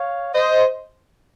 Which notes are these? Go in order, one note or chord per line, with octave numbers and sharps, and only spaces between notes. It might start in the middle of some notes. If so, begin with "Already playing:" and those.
Already playing: C#5 F5
C5 D#5